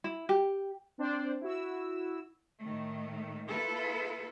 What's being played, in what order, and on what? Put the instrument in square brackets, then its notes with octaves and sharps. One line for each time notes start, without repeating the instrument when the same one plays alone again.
[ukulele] E4
G4
[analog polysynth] C4 D4 C5 D5
E4 F#4 E6
[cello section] A2 D#3 A3
A#3 E4 F4 A4 B4